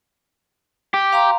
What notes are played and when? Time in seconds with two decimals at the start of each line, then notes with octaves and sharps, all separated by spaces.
0.94 G4
1.13 F5 A#5 C6